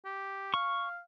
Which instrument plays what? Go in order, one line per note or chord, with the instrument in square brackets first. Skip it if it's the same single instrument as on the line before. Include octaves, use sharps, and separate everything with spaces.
[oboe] G4
[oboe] F5 [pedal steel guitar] C#6